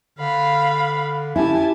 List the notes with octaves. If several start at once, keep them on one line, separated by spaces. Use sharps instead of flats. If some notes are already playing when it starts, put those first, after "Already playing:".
D3 F5 B5
C#4 E4 G4 G#5 A5